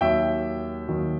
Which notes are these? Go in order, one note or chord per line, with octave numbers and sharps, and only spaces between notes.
D#2 D#3 F#3 E5 G5
D#2 D#3 F#3